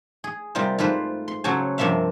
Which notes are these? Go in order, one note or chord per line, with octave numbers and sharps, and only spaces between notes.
G#4
C3 G3 F4 A#4 C5
G#2 A3 F4 B4 C5
C6
C#3 F#3 F#4 A4 C5 G#5
G2 C3 F3 A#3 E5 F5